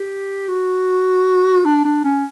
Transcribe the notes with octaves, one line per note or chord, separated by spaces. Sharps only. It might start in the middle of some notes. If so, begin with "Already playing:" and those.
Already playing: G4
F#4
D4
D4
C#4